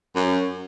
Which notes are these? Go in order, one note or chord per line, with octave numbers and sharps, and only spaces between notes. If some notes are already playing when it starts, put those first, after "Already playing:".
F#2